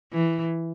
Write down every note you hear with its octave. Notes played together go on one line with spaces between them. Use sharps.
E3